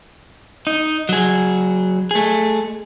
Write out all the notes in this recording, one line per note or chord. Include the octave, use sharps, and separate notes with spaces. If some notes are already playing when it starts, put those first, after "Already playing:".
D#4
F#3 G#4
A3 G#4